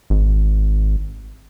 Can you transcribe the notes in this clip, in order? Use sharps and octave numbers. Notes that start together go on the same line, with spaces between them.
G#1